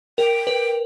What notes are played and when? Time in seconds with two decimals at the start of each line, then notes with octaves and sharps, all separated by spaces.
0.18 A#4 G5
0.47 B4